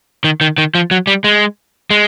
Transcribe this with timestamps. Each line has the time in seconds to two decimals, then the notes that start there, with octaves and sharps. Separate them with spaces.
0.24 D#3
0.41 D#3
0.58 D#3
0.75 F3
0.91 F#3
1.07 G3
1.24 G#3
1.91 G#3